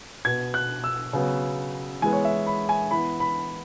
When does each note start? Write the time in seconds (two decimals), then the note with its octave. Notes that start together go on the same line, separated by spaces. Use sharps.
0.25 B2 B3 G#6
0.54 F#6
0.84 E6
1.13 C#3 F#3 B3
2.02 E3 G#3 B3 G#5
2.13 C#5
2.25 E5
2.47 B5
2.69 G#5
2.91 E3 B3 B5
3.20 B5